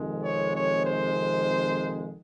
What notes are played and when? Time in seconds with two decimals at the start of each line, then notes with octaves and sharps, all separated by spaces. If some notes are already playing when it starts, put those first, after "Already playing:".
Already playing: F2 C3 D#3 G#3
0.24 C#5
0.55 C#5
0.86 C5